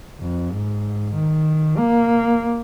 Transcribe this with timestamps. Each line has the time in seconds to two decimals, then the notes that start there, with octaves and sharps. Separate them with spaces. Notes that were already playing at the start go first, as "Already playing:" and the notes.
0.21 F2
0.51 G#2
1.14 D#3
1.78 A#3